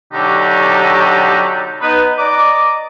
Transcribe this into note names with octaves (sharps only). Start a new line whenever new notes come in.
B2 D3 F#3 D4 D#4 G4
B3 D#4 B4
D5 D#5 A#5 D6